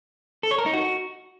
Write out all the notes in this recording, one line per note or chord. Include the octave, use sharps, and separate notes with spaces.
A4
C#5
A#4
D#4
F#4